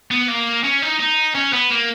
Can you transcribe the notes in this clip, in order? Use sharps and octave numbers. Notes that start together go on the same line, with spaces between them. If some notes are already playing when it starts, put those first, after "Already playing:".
B3
A#3
C#4
D#4
D#4
C#4
B3
A#3